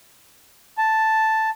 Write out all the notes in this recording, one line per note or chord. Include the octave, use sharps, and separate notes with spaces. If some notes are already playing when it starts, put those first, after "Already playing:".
A5